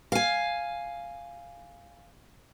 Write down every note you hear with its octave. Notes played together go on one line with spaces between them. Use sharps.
F5 G#5